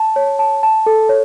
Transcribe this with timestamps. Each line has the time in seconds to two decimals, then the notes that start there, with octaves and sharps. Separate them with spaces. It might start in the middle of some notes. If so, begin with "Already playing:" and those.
Already playing: A5
0.16 C#5
0.39 A5
0.63 A5
0.86 A4
1.09 C#5